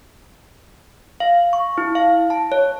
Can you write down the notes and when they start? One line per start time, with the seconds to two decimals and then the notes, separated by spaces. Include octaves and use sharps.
1.20 F5
1.53 C#6
1.78 E4
1.95 F5
2.30 A5
2.52 C#5